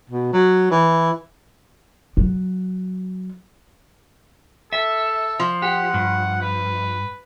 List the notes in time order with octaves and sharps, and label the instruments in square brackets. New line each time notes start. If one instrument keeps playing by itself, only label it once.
[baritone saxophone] B2
F#3
E3
[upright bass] F#3
[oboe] A4 [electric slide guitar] E5
[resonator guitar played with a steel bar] F3
[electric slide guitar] G4 [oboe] F#5
[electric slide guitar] G2
[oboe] B4